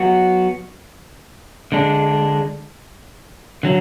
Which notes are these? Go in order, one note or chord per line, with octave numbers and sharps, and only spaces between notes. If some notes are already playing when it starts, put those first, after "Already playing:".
Already playing: F#3 B3 F#4
D3 G#3 D4
D3 F#3